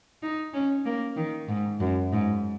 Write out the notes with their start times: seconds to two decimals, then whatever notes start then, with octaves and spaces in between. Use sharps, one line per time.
0.23 D#4
0.54 C#4
0.86 A#3
1.17 D#3
1.48 G#2
1.80 F#2
2.12 G#2